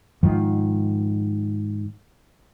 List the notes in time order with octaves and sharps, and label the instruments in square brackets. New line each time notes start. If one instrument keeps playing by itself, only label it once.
[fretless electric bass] G#2 D#3 F3